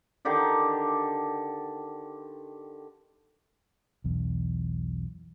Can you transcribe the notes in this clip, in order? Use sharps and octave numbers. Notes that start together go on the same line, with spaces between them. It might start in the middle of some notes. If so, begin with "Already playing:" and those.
D3 D#3 G4 D5
B1 E2